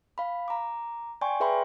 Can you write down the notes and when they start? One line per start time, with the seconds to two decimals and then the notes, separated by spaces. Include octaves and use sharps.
0.18 F5 B5
0.48 A#5 D6
1.21 D5 G5 G#5 C6 C#6
1.40 G#4 B4 E5 G5 B5 C6